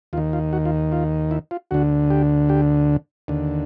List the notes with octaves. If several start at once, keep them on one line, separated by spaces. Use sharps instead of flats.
D#2 D#3 F4
F4
F#4
F4
F4
E4
F4
D2 D3 F#4
G4
G4
D#2 D3